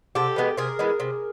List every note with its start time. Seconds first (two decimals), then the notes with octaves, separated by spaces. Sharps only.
0.15 C3 G4 A4
0.36 E3 G#3 B3
0.57 C3 G#4 A#4
0.79 E3 G#3 B3
1.00 C3